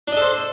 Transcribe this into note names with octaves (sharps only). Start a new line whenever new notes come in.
D4 A4 C5 D#5